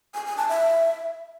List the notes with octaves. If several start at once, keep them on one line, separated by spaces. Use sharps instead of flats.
G#5
G#5
A5
E5